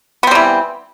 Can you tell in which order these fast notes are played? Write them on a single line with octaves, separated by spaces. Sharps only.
B3 C4 G3 E3